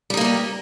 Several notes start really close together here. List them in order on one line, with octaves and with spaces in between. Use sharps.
G3 D#4 A#3 A#4 G4